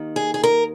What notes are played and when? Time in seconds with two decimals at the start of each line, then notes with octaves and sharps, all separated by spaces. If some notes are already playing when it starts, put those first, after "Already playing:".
Already playing: D#2 D#3
0.16 G#4
0.34 G#4
0.44 A#4